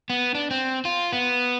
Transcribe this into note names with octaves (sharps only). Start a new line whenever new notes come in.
B3
D4
C4
F4
B3